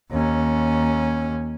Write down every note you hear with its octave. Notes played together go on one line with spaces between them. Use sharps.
D#2 C#4